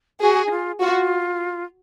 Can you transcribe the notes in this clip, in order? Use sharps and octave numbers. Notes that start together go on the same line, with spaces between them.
F#4 G#4
D#4
F4
F4 F#4